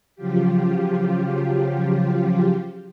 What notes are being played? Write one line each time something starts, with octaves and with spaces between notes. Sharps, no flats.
C#3 F3 F#3 F4 G4